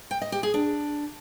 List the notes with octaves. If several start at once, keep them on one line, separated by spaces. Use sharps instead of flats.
G5
D#5
G4
G#4
D4